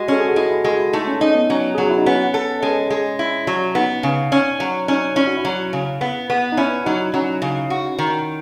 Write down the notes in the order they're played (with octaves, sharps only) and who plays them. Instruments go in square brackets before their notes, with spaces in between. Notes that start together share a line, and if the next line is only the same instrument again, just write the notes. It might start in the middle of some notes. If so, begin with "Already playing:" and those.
Already playing: [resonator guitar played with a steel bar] G#3 [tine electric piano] F#4
[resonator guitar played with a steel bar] C#4 [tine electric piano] A4
[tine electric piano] G#4
F#4
[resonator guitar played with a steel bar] G#3 [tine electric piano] E4
[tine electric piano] E4
[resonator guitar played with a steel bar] G#3 [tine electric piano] F#4
[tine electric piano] E4
[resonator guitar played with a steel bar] A3 [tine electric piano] D#4
[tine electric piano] C#4
[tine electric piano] C#4 [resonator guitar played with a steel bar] D#4
[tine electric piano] B3
[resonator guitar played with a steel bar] F#3 [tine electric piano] C#4
[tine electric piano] G#4
[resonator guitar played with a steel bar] F#3 [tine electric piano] F#4
[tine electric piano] E4
D#4
[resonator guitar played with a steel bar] B3 [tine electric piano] C#4
[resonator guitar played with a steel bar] A4
[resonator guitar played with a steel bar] G#3 [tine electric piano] C#4
[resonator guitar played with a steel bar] G#3
E4
F#3
[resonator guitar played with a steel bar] B3 [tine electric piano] D#4
[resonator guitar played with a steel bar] C#3
C#4
F#3
[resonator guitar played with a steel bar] C#4 [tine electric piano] D#4
[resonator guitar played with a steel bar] C#4 [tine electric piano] E4
[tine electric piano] F#4
E4
[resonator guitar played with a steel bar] F#3
C#3
B3
B3
[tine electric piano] D#4
[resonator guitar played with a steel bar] C#4 [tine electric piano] E4
[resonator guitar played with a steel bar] F#3 [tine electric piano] D#4
[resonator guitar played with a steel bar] F#3 [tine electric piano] C#4
[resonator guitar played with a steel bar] C#3
F#4
D#3